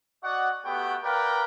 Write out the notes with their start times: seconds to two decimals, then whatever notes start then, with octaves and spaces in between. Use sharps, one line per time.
0.23 F#4 D5 D#5 F#5
0.65 A3 B3 F#4 G4 F#5 G5
1.04 A#4 B4 D5 F5 G5